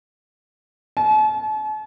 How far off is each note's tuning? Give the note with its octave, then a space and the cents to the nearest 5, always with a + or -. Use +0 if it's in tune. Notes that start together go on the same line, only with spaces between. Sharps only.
A5 -40